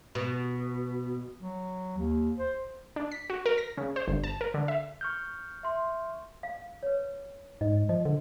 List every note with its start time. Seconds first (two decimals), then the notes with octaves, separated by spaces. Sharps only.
0.15 B2
1.40 F#3
1.98 D#2
2.38 C5
2.96 D4
3.12 B6
3.30 F#4
3.46 A#4
3.58 A#6
3.77 C#3
3.96 C5
4.08 G1
4.24 A5
4.41 A#4
4.54 D3
4.68 E5
5.01 C#6 F6 G6
5.63 E5 C6
6.43 F5
6.83 B4 C#5
7.61 G#2 D#5
7.89 F3 D#5
8.05 D3